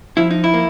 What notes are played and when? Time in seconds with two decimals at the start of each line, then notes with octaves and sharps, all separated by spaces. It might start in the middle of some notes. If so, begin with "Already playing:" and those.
0.17 F3 E4
0.31 D#4
0.44 E4
0.54 A#3